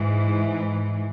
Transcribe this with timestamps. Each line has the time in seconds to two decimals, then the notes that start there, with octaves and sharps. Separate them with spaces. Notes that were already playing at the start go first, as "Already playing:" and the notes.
Already playing: G#2 E3